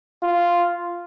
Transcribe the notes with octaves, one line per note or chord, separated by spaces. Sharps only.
F4